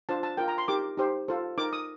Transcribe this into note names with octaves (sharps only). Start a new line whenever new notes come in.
D4 F4 C5 A5
A5
F4 A#4 G5
A#5
C6
D#4 G4 A#4 D6
D#4 G4 C5
F4 A4 C5
D#4 A#4 D6
D#6